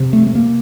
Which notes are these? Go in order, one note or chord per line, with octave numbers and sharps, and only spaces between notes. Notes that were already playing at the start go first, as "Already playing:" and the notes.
Already playing: C3
A3
A3
C3 A#3